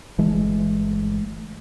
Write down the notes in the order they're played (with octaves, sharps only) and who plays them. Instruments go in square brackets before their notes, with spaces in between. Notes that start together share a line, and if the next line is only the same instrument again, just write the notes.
[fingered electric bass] G1 E3 G#3 A3